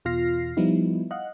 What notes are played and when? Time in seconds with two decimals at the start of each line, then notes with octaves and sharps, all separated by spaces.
0.05 E2 B2 F4 F6 A#6 C7
0.57 F3 G3 B3 D#4 E4
1.11 D#5 F5 F#5 F#6